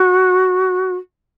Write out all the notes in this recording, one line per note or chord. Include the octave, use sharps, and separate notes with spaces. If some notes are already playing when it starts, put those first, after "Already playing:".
Already playing: F#4